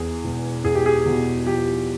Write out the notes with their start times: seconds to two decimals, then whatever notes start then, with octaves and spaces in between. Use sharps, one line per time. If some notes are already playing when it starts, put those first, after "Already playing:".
Already playing: E2 G#4
0.24 E1
0.64 E2 G#4
0.75 G4
0.86 G#4
1.06 B2
1.46 F3 G4